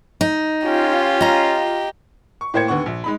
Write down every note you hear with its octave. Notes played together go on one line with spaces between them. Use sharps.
D#4
C#4 F4 G4
D#5 A#5
C#6
A2 A#3 C5 G5 G#6 C#7
D#2 D3 B3 F#5 C#6
A#1
G#3 D#4 B5